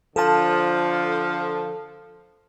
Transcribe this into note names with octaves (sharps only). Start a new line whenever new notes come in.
D3 F3 A4 A5